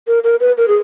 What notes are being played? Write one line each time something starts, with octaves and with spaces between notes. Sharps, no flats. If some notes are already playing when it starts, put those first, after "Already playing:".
A#4
A#4
B4
A#4
G#4